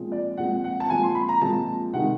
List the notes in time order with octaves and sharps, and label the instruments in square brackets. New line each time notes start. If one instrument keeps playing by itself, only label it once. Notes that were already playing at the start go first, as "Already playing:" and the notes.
Already playing: [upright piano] A#2 F3 G#3 C4
D5
A#2 F3 G#3 C4 F#5
F#5
A5
A#2 F3 G#3 C4 G#5
C6
B5
A#5
A#2 F3 G#3 C4 A5
C3 D#3 G#3 F#5